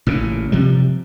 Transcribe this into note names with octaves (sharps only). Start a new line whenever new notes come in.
A1 A#2 C#3
C3 F3 G3